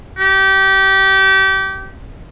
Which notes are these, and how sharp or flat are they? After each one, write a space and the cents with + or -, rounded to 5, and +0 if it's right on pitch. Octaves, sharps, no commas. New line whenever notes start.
G4 -25